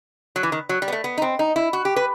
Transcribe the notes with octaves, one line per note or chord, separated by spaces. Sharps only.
F#3
E3
D#3
F#3
G3
B3
A3
B3
D#4
C4
D#4
E4
F#4
G4
B4